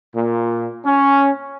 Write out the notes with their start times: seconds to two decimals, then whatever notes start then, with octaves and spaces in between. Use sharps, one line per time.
0.16 A#2
0.85 C#4